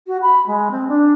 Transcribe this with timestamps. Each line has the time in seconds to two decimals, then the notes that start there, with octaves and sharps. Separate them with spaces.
0.07 F#4
0.22 B5
0.47 G#3
0.71 C4
0.88 D4